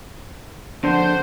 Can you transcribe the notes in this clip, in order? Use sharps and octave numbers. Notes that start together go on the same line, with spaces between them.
F2 D3 D4 C5 F#5